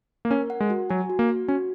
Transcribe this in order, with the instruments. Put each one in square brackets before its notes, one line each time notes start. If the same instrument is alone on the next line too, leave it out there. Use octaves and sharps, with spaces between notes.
[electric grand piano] A#3
[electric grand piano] C#4 [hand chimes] A#4
[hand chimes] F#5
[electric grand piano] G#3
[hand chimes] F#4
[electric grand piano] F#3 [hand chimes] G#5
[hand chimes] F#4
[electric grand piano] A#3
[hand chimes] F#4
[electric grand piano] C#4 [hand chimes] F#4